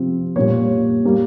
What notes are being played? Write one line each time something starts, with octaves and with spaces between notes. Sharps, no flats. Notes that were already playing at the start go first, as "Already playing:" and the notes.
Already playing: C3 F3 C4
A#2 G3 A#3 C#5
G3 A#3